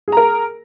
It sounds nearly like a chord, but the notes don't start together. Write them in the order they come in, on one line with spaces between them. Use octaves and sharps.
G#4 A#5 A#4